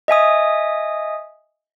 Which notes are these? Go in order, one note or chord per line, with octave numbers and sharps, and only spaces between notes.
D#5 E5 G#5 D#6